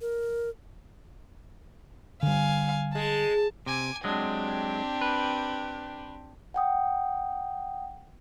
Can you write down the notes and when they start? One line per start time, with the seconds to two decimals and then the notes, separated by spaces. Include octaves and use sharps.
0.01 A#4
2.23 D3 G3 F5 G#5
2.95 G#3 A5
3.66 C3 G#5 D6
4.04 F#3 G#3 C4 D4 G4
5.01 B4
6.54 F#5 G5 D#6